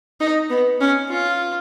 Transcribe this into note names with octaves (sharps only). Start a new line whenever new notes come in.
D#4
B3
C#4
F4